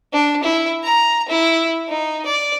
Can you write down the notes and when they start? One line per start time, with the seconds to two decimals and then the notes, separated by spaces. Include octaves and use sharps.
0.13 D4
0.43 E4
0.84 A#5
1.29 E4
1.89 D#4
2.26 D5